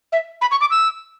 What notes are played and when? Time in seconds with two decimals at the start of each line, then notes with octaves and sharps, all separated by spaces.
0.12 E5
0.41 B5
0.51 C#6
0.61 D6
0.71 E6